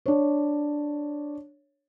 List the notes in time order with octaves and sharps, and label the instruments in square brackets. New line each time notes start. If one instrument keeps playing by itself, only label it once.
[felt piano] D4 C#5